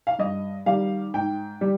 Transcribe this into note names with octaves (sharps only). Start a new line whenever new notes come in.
F5
G2 D#5
D#3 G3 F5
G#2 G5
G3